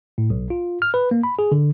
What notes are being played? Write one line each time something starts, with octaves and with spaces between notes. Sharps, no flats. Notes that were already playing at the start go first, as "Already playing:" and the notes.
A2
B1
F4
F6
B4
A#3
B5
G#4
D3